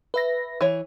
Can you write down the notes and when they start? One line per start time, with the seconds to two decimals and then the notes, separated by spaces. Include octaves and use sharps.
0.14 B4 E5 A#6
0.61 E3 C#5